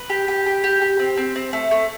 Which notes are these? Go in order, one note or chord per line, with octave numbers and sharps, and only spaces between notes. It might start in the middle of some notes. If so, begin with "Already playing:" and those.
Already playing: B4
G4
G4
G4
G4
G4
C4
C4
C4
A3
A3